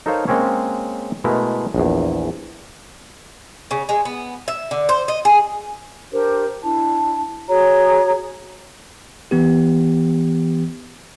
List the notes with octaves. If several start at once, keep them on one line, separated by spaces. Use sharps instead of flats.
D#4 A4 A#4 C5 C#5 F5
G#3 A#3 C4 C#4 C#5
B2 G#3 A3 E4 A#4
A#1 E2
C#3
G#3
B3
E5
D3
C5
D#5
G#4
D4 G4 A#4 C5
D4 E4 A5
F#4 G#4 C#5 A#5
E3 B3 G4